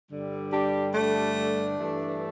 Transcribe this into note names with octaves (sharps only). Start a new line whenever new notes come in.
G2 D3 G3
D4 G4
A3 D4
G2 E3 A3